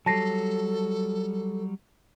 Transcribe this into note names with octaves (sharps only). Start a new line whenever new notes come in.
F#3 G3 A4 A5 A#6 C7